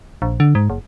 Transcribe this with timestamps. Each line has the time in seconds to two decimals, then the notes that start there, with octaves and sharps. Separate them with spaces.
0.22 A#1
0.40 D3
0.55 G#2
0.70 F#1